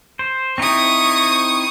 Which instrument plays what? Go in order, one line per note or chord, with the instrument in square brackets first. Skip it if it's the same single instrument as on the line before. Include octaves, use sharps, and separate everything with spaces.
[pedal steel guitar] C5
[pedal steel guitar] C4 D#4 E4 [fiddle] C#6 D#6